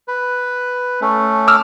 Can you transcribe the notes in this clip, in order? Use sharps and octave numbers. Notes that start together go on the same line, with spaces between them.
B4
A3 C#4
D6 E6 F6